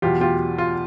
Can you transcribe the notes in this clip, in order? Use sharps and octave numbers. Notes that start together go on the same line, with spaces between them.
E2 B2 F#3 F4 G4
F4 G4
F4